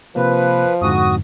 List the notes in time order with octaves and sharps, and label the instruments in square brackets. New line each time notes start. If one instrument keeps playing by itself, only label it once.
[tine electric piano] C3 A#3 [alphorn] F3 [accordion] B4
[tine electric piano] F2 G#2 D3 [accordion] F#4 D#6